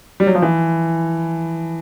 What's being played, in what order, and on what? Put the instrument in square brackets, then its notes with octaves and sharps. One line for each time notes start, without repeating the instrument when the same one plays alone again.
[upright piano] G3
F#3
F3
E3